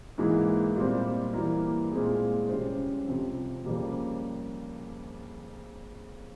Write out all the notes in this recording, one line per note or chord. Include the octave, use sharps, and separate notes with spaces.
G#2 E3 A#3 E4 G#4
A#2 G3 C4
E3 G3 A#3 E4 A#4
A#2 G#3 C4 E4 G#4
C#3 G3 C#4 G4 C5
F2 C3 F3 C4
F2 C#3 G3 A#3